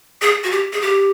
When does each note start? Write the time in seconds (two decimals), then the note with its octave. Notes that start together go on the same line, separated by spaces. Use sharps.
0.22 G#4
0.44 F#4
0.51 G4
0.73 G#4
0.82 G4